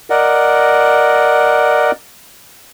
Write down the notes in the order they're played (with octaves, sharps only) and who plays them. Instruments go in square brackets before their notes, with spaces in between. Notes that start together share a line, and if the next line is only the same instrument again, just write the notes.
[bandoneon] A#4 D5 D#5 F#5